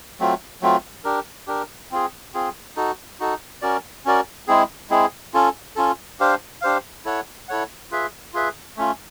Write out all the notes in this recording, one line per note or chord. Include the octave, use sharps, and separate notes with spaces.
F#3 A3 C4 F4
F#3 A3 C4 F4
D4 G4 A#4
D4 G4 A#4
C4 F4 G#4
C4 F4 G#4
D#4 F#4 A4
D#4 F#4 A4
C#4 F#4 A#4 D5
C#4 F#4 A#4 D5
G#3 C4 E4 G#4
G#3 C4 E4 G#4
C#4 F4 A4
C#4 F4 A4
D4 G4 C5 F5
D4 G4 C5 F5
E4 A4 C#5 F#5
E4 A4 C#5 F#5
F4 G#4 B4 E5
F4 G#4 B4 E5
A3 C#4 F4